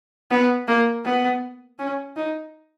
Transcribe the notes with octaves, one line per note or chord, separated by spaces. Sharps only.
B3
A#3
B3
C#4
D#4